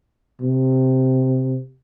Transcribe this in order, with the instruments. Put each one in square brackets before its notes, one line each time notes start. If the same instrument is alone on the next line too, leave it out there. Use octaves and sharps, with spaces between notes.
[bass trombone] C3